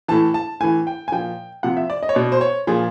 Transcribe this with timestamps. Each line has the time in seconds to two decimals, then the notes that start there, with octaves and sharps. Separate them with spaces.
0.08 A2 E3 A5
0.34 A5
0.60 A2 E3 G#5
0.87 G5
1.08 G#5
1.12 A#2 F3 G5
1.63 C3 F3 F#5
1.77 E5
1.90 D5
2.03 D#5
2.09 C#5
2.15 B2 D5
2.32 C5
2.41 C#5
2.67 A#2 F3 G#4